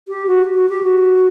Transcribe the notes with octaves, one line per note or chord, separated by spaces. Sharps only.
G4
F#4
F#4
G4
F#4